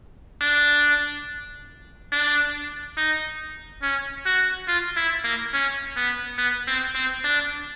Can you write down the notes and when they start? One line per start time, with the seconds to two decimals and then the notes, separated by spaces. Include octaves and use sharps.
0.41 D4
2.13 D4
2.97 D#4
3.83 C#4
4.26 F#4
4.68 F4
4.97 E4
5.25 A#3
5.54 C#4
5.97 B3
6.38 B3
6.68 C4
6.95 C4
7.24 D4